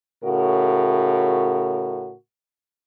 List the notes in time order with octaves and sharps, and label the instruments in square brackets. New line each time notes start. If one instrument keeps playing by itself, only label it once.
[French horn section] A2 C#3 F#4 A#4